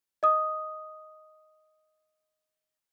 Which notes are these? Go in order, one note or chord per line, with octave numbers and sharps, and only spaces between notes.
D#5 D#6